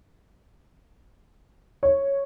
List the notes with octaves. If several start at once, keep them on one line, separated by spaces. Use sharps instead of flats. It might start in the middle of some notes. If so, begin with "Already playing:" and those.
C#5